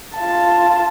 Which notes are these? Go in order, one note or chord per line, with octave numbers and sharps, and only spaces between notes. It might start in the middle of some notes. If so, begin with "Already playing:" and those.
F4 A5